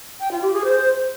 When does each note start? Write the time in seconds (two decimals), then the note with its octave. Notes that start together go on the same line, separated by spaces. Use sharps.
0.20 G5
0.31 F4
0.42 G4
0.53 G#4
0.64 C5